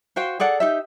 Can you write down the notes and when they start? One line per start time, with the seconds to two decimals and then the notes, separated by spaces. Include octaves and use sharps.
0.16 F#4 C5 F5 G5
0.40 G#4 A4 D5 F#5
0.60 D#4 G4 E5